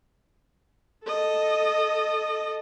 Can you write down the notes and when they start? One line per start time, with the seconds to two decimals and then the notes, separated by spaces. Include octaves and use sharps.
1.06 A4 D#5